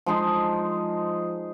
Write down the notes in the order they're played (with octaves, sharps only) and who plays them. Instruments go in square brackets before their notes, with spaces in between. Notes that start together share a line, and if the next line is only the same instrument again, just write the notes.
[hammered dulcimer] F3 G#3 D#4 G#4